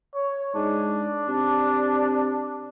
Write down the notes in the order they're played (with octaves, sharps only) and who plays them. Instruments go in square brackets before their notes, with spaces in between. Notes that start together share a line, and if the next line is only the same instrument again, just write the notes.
[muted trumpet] C#5
[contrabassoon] G#2 [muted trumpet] D4
[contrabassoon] C3